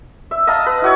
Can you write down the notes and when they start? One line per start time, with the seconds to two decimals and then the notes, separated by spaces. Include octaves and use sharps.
0.31 E5
0.47 D#5 F5 A5 A#5
0.66 B4
0.82 E4 F#4 C#5